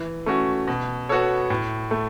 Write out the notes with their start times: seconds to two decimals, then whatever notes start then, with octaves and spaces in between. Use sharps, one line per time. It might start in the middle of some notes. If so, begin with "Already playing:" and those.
Already playing: E3
0.26 A3 C#4 F#4
0.68 B2
1.09 B3 F#4 A4 C#5
1.50 A2
1.91 A3